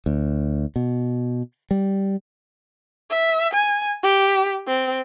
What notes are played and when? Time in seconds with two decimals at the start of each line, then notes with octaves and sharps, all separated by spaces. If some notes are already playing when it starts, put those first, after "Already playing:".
0.06 D2
0.76 B2
1.71 G3
3.10 E5
3.53 G#5
4.03 G4
4.67 C4